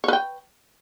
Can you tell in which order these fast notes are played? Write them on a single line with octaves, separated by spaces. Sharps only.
C#5 B4 G5